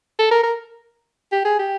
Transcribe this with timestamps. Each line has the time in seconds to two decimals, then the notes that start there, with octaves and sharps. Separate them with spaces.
0.19 A4
0.32 A#4
0.44 A#4
1.32 G4
1.45 G#4
1.59 G4